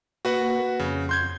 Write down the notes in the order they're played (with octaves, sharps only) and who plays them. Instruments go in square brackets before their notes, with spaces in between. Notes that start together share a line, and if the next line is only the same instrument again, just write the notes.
[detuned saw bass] A#3 [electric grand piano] F#4 B4 F#5
[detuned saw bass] F2 [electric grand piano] C#3
[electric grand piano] C6 G6 G#6